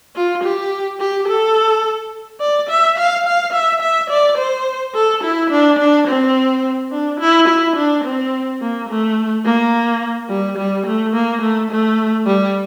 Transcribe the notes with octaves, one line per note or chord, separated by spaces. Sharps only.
F4
G4
G4
A4
D5
E5
F5
F5
E5
E5
D5
C5
A4
E4
D4
D4
C4
D4
E4
E4
D4
C4
A#3
A3
A#3
G3
G3
A3
A#3
A3
A3
G3